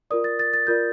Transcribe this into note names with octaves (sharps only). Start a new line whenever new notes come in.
F4 A#4 D5 D#6
A6
A6
A6
F4 A#4 D5 G6